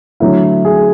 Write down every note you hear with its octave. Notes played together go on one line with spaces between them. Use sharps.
D3 F#3 A3 E4
G#4